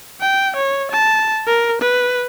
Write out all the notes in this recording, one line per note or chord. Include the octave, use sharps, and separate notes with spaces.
G5
C#5
A5
A#4
B4